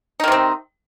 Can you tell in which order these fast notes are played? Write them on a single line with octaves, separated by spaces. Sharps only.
D#4 D#3 C3 C4